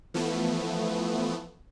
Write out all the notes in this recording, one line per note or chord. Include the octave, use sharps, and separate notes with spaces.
E3 F3 A3 B3